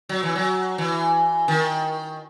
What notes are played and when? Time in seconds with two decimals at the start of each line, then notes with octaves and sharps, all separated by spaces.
0.09 F#3
0.23 E3
0.35 F#3
0.78 E3
1.48 D#3